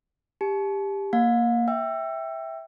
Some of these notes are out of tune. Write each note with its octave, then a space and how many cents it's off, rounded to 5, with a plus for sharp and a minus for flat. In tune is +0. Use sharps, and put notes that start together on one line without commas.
G4 +15 A5 -40
A#3 +0 F5 +40
E5 -5 G5 +0 E6 +25